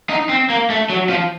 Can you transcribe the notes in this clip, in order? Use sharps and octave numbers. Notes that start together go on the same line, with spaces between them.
D#4
C4
A#3
A3
F#3
F3